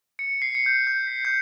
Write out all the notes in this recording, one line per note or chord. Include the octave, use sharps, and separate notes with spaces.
C#7
C7
C#7
G6
G6
B6
G6